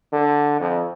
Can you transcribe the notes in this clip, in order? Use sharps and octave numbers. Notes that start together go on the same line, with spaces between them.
D3
F2